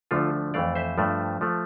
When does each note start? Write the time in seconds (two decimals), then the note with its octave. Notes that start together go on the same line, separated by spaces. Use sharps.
0.11 D2 D3 F3 A3 F4 A4
0.54 F2 E3 A3 D5 F5
0.75 C5 E5
0.98 G2 F3 A3
1.41 F3 A3